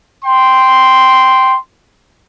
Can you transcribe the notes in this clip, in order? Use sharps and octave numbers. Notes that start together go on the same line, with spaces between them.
G5 C6